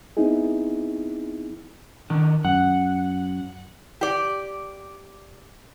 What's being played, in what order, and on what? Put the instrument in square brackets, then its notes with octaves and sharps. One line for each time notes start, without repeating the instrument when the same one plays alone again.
[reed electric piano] B3 C4 D#4 E4 G#4
[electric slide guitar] D#3 D4
[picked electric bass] F#2 [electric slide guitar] F#5
[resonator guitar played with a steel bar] G4 D5